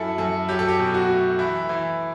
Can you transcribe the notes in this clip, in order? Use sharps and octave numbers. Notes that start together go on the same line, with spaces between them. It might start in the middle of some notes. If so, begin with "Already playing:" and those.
Already playing: F#2 F#3 E4 A4
F#2 A4
F#3 G4
A4
G4
B2
F#4
A3
E3 E4
E3